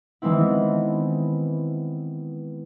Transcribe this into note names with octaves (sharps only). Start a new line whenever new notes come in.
D#3 E3 G#3 B3 C4 E4